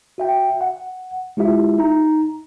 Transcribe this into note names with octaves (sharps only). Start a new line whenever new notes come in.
F#4 E5 G5
F#5
G#3 E4 F4 G4 E5
D#4 A#5